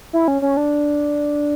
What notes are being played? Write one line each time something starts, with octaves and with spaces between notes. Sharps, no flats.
E4
C#4
C#4
D4